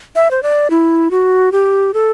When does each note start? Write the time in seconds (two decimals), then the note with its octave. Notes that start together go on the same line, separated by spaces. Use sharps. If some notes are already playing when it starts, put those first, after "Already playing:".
0.15 E5
0.31 C5
0.43 D5
0.70 E4
1.11 F#4
1.52 G4
1.94 A4